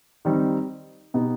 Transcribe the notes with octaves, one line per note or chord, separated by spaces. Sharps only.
D#3 G3 C4 D#4
B2 B3 D#4 G4